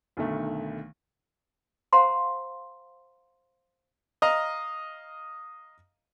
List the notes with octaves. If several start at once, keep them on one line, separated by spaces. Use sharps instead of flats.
B1 D3 D#3 A3
C5 F5 F#5 A#5 C6
D#5 F5 A#5